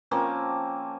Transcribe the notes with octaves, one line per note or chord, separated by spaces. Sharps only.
F3 A#3 C4 C#4